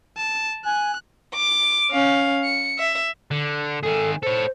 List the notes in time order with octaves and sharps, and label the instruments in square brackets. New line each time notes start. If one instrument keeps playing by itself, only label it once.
[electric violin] A5
[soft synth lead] G#5 [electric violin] F#6
[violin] D6
C#4 F5
C#7
E5
[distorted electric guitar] D3
[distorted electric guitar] D#3 G#4 [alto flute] A4
[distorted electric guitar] A4 C#5 [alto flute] C5